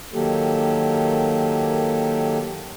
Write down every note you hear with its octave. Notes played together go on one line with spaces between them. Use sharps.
D#3 F#3 A#3 G4 A4